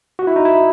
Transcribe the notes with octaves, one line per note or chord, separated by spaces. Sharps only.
F#4
E4
D#4
E4